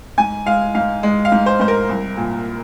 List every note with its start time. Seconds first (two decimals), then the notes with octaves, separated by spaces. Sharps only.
0.18 G#2 G#5
0.46 G#3 F5
0.75 G#2 F5
1.03 G#3
1.25 F5
1.32 G#2
1.46 C5
1.60 G#2 C5
1.68 A#4
1.89 C2
2.17 A#2